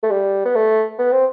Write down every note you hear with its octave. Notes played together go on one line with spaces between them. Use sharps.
A3
G3
B3
A3
B3
C4